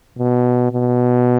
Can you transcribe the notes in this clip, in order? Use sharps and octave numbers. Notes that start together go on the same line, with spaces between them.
B2
B2